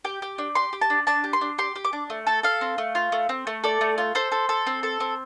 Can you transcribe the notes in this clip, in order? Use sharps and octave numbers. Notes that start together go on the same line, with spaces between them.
G4 G5
G4
D4
G4 C6
G4
A5
D4
D4 A5
G4
C6
D4
G4 C6
G4
D6
D4
A3
A4 A5
A4 F5
C4
A3
F4
A3
C4
A3
A4 D5
A3
F4
A4 C5
A4
A4
C4
A4
C4